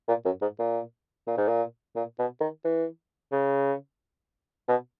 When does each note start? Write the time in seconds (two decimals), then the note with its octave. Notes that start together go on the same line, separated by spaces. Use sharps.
0.08 A#2
0.25 F#2
0.41 G#2
0.59 A#2
1.27 A#2
1.37 G#2
1.48 A#2
1.96 A#2
2.19 B2
2.41 D#3
2.64 E3
3.32 C#3
4.68 B2